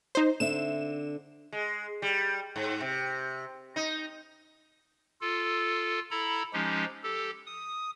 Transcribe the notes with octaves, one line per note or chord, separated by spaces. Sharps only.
D#4 C5
D3 C4 E5 E7
G#3
G3
G#2
C3
D#4
F4 A4
E4 A4 A#5 B5
F3 G#3 C#4 D#4 G4
G4 A4
D#6